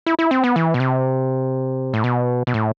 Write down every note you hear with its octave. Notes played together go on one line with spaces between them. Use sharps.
E4
E4
C4
B3
E3
B2
C3
A2
B2
B2
A2